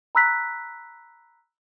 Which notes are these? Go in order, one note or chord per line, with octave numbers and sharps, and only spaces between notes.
A#5 B5 E6 F#6 B6